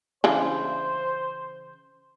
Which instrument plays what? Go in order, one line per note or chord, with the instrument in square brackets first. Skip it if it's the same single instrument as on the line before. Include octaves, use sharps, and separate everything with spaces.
[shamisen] C#3 E3 D4 [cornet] C5